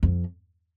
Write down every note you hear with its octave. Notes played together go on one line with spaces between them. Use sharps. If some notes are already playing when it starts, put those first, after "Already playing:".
F2